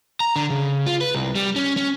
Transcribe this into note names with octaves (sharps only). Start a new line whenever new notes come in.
A#5
D3
C#3
F4
B4
C2
G3
C#4
C#4